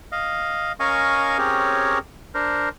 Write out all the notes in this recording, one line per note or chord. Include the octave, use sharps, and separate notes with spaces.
D#5 F5
C#4 A#4 D#5 F5 G#5 C#6
C4 C#4 G4 G#4 A#4 C#5
D4 A#4 C5